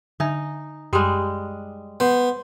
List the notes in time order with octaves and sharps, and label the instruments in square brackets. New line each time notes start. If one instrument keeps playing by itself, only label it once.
[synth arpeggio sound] D3 E5 G#5 [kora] D#4
[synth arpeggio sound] F#2 C6 D#6 [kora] G3 G#3
[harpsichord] B3 [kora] C5